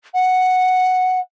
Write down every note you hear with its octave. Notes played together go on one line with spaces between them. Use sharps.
F#5